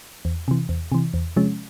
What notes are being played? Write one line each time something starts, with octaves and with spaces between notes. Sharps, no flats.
E2
C3 E3
E2
C3 E3
E2
C3 F3 G#3 C#4